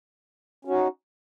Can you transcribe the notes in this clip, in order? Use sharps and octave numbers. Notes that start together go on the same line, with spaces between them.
C#4 D#4 F#4